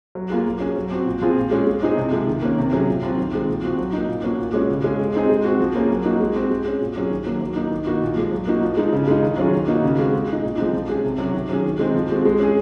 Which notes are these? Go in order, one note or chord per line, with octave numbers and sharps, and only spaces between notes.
F#3
A#3 F4 G#4
F#3
C#4 G#4
F#3
C4 F#4
A#2
F3 C4 F4 G#4
A#2
G#3 C#4
G#3
C4 D#4 G#4
C3
F3 G#3
D#3
A#3 C#4
C3
F#3 C#4 G#4
A#2
F#3 C4 F4
D#3
G#3 C4
A#2
F3 C4 F#4
F#3
A#3 D#4
A#2
F3 A#3 C#4 F#4
A#2
G#3 C#4 F#4
C#3
G#3 C#4 G#4
G#3
C4 D#4 G#4
G#3
C4 F#4
F3
A#3 C#4 G#4
F#3
A#3 D#4 F#4
G#3
C4 F#4
G#3
C#4 G#4
A#2
F#3 C#4 G#4
D#3
F#3 A#3
F#3
A#3 D#4
D#3
A#3 D#4 F#4
A#2
F3 G#3
F#3
A#3 D#4 F#4
F3
G#3 D#4
C#3
G#3 D#4
D#3
F#3 C#4 F4 G#4
D#3
A#3 D#4 F#4
C#3
G#3 C4 F#4
G#3
D#4 G#4
A#2
F3 G#3 C4 D#4
F3
G#3 C#4 G#4
C3
F#3 C#4 F#4
D#3
F#3 C#4 G#4
D#3
G#3 C4 D#4
F3
G#3 C4 F#4
G#3
C#4 G#4